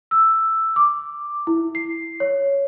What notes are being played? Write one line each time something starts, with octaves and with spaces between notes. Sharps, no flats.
E6
D6
E4
C7
C#5